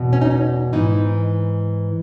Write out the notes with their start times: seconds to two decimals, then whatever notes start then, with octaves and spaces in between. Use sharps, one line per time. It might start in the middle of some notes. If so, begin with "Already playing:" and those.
Already playing: E2 B2
0.13 C#4
0.21 D#4
0.31 C#4
0.73 G#2 E3 D#4